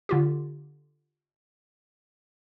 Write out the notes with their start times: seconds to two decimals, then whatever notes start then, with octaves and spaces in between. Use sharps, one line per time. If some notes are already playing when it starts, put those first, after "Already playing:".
0.09 D3 F4 G4